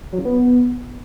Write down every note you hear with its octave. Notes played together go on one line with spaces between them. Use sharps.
F#3
C#3
B3